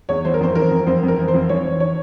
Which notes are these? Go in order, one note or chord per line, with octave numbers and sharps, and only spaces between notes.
E2 C#5
E3 C5
A#4
F2 C5
E3 A#4
F2
F2 C5
F2
A#4
E3
C5
F2
E3 C#5
E3
C#5